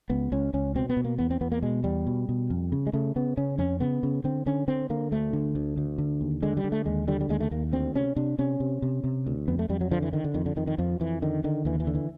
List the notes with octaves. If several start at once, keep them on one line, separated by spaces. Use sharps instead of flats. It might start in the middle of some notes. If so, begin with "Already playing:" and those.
C#2 B3
C#2 C#4
C#2 C#4
B2 C4
B3
B2
A#3
E2 B3
C4
E2 B3
A#3
B2 G#3
E2 G3
B2
B2
F2
C#3
G#3
C#3 A3
C#3 B3
C#3 C#4
F2 C#4
C#3 B3
C#3
D3 C4
D3 C#4
D3 C4
D3 A#3
D2 A3
D3
D2
D2
D3
D#2
D3 G#3
G3
D3
A3
D#2 G#3
D3 G3
G3
D#2 G#3
A3
D#2 A#3
D2 C4
C3 C#4
C3 D4
C3 C#4
C3
C3
C3
D2
F2 B3
A3
F2 G3
F#3
D3 F3
E3
D3 D#3
D3
F2 D#3
D3
F2 D#3
D#3
F2 F3
F2 E3
D3 D#3
D3 D#3
D#2 E3
E3
D3
E3